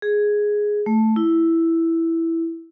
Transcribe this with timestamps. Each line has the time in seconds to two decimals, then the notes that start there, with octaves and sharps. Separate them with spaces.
0.02 G#4
0.86 A3
1.16 E4